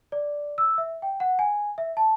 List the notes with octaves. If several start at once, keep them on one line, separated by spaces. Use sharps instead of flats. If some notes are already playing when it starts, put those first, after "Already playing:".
D5
E6
E5
G5
F#5
G#5
E5
A5